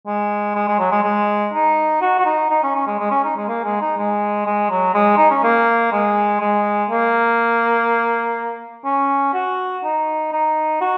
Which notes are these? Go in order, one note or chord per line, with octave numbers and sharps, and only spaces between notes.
G#3
G#3
G#3
F#3
G#3
G#3
D#4
F#4
F#4
D#4
D#4
C#4
C#4
G#3
G#3
C#4
D#4
G#3
A#3
G#3
D#4
G#3
G#3
F#3
G#3
D#4
C#4
A#3
G#3
G#3
A#3
C#4
F#4
D#4
D#4
F#4